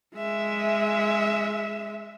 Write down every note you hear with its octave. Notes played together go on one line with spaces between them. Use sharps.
G#3 E5